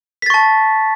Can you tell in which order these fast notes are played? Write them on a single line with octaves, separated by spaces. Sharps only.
B6 A6 C#6 A5